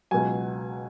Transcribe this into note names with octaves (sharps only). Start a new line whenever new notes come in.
C#2 B2 F#3 G#5